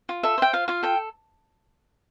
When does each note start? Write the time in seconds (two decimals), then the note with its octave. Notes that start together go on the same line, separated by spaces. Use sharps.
0.09 F4
0.23 A4 E5
0.38 C5 G5
0.53 F4 F5
0.68 F4 F5
0.83 A4 G5